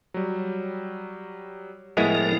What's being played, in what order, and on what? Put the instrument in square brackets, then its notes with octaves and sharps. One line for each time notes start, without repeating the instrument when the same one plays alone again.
[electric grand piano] F#3 G3
[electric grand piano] A2 D#7 [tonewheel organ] F3 A#4 [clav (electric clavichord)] G#3 B3 E4